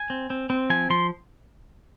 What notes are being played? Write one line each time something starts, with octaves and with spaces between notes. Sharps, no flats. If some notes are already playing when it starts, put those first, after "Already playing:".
Already playing: G#5
C4
C4
C4
F3 G#5
F3 C6